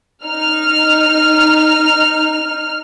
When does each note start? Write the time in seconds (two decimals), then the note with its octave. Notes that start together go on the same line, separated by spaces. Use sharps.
0.25 D#4 F6